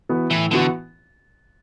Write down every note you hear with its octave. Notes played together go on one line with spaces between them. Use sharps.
E3 B3 F#4
A2 E3
D3 E3 B3 F#4